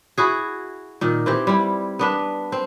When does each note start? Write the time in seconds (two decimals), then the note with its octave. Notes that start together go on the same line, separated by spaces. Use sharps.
0.18 E4 F#4 G#4
1.01 A#2 D#3
1.26 E3 C4 G4
1.47 G3 E4
1.99 B3 D4 B4
2.52 C4